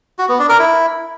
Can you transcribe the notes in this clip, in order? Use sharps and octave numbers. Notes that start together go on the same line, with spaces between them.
F#4
B3
D4
A#4
E4